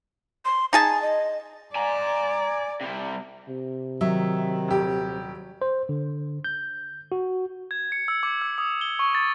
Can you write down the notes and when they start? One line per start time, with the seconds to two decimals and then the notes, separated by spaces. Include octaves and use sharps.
0.45 C6
0.73 D#4 G#4 G#5 A5
1.02 D#5
1.76 D5 G#5 A#5
2.81 C3 G3
3.49 C3
4.01 D#3 F#3 E5
4.68 D#1 G4
5.62 C5
5.89 D3
6.44 G6
7.12 F#4
7.71 G#6
7.92 C#7
8.08 E6
8.23 D6
8.42 E6
8.58 D#6
8.81 G7
8.99 C#6
9.15 A6